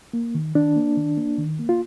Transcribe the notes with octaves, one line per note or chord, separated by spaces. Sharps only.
A#3
D#3
D#3 D4
A#3
D#3
A#3
D#3
A#3
F4